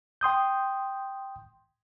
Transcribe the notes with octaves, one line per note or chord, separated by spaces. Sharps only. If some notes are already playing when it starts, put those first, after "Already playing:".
G5 C6 D#6 G6